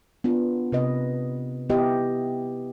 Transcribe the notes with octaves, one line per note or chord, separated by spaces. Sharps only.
B3 D4 F4
C3 B4 D#5
B3 E4 G4 D#5